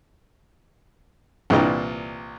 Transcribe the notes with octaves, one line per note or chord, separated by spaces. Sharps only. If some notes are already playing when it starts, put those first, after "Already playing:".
C2 A#2 E3 D4 D#5 A#5